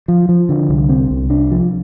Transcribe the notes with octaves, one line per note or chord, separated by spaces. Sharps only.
F3
F3
D3
C2
C4
C2
D4
F3